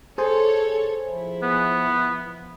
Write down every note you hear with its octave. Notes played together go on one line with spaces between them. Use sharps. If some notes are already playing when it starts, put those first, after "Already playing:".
G#4 A4 C5 C#5 G#5
F3 E4
B3